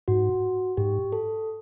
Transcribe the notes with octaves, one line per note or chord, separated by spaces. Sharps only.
G#2 F#4
G#2 G4
A4